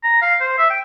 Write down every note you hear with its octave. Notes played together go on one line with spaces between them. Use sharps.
A#5
F5
C5
E5
G5